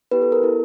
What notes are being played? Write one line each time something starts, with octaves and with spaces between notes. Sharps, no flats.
B3 E4 G4 B4
A4
A#4
B3 E4 A4